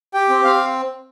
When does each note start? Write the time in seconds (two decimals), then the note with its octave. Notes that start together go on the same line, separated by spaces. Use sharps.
0.14 G4 G5
0.29 C4
0.44 C4 F5